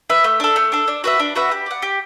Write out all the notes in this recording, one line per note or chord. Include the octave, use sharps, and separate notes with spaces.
B4 E5
A3
D4 A4
A3
D4 A4
D4
F#4 B4 E5
D4
F#4 B4 E5
G4
D5 F#5
G4